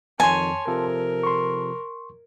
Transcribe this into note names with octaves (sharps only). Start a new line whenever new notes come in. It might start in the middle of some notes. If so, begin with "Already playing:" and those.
F2 D#3 C#5 G#5 A5 C6
C3 F3 A4 A#4
C6 C#6